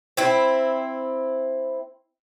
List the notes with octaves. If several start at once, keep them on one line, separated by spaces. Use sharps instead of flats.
C4 E4